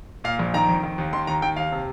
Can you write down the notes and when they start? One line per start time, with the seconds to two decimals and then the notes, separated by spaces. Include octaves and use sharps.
0.24 A#2 F5
0.39 A#1
0.54 D#3 A#5
0.69 F2
0.83 D#3
0.98 D#2
1.13 D#3 C6
1.27 D#2 A#5
1.42 D#3 G5
1.57 D#2 F5
1.72 C3